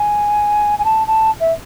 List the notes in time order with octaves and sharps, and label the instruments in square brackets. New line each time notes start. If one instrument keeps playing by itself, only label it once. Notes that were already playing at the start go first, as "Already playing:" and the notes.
Already playing: [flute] G#5
G#5
A5
A5
E5